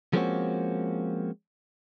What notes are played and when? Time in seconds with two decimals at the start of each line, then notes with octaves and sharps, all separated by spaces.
0.13 F3 G#3 A#3 C4 C#4 F#4